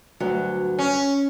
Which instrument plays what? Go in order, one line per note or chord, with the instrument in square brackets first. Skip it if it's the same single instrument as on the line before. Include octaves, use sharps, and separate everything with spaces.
[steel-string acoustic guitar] D2 G2 F#3
[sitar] C#4